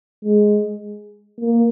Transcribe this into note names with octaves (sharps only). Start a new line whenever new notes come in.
G#3
A#3